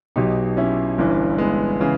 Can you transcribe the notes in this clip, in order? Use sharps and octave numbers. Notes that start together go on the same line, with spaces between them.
B1 B2 D#4 G4
C#4 E4
G1 G2 E3
G#3 B3
C#3 E3